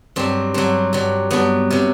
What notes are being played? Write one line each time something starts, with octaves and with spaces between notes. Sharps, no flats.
G2 F#3 C4
G2 F#3 C4
G2 F#3
G2 F#3 B3
C3 F#3